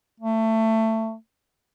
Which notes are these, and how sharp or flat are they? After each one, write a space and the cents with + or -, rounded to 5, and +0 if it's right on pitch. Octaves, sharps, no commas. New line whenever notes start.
A3 +20